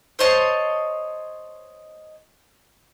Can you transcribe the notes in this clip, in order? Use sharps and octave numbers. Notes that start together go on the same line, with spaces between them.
C5 C#5 D#5 A5